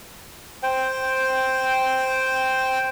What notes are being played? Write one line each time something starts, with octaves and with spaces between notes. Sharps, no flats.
C5 G5